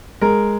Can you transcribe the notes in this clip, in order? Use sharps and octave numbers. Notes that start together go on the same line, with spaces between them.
G#3 A#4